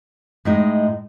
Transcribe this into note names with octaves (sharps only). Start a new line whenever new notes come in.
A2 G#3 D#4